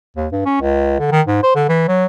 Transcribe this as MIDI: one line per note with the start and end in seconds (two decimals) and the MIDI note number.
0.16 0.27 39
0.32 0.41 43
0.46 0.57 61
0.61 0.97 37
0.99 1.10 50
1.11 1.21 51
1.27 1.40 44
1.43 1.54 72
1.55 1.68 50
1.69 1.84 52
1.88 2.06 54